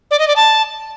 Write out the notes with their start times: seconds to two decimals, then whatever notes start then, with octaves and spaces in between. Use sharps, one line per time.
0.11 D5
0.19 D#5
0.28 D5
0.36 A5